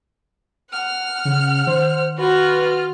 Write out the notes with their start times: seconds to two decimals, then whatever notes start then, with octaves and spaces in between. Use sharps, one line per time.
0.69 F#5 F6
1.25 C#3
1.67 D#3 C5
2.18 F4 F#4 B4 F6